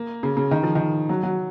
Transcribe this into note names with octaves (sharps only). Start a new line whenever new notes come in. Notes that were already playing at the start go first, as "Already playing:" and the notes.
Already playing: A#3
C#3
C#3
D#3
F3
D#3
F#3
F#3